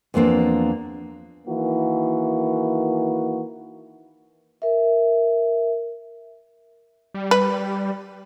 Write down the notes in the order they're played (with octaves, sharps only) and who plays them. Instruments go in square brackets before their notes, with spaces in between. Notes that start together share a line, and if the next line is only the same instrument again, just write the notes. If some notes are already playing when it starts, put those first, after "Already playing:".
[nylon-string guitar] E2 F3 A#3 C4 D4
[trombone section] D#3 E3 A#3 F#4
[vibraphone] A#4 E5
[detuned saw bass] G3
[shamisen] B4